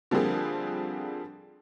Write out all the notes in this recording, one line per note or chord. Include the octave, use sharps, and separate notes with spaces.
D3 F3 G3 A#3 C4 G#4